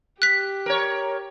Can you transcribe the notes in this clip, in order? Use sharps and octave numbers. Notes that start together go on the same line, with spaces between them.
G4 F#6 B6
A#4 C#5